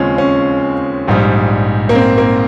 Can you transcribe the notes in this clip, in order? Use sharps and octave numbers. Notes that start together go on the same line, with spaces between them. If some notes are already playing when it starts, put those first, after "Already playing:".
Already playing: D#2 C#3 F3 G#3 C4 C#4
C#4
A#1 G#2 G3
A#3
C4
A#3